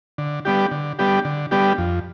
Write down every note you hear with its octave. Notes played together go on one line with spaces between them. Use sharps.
D3
G3 B3 D4 G4
D3
G3 B3 D4 G4
D3
G3 B3 D4 G4
F2